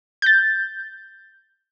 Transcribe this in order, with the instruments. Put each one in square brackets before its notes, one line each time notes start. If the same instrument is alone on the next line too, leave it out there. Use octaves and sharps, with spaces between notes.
[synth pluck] G6 A6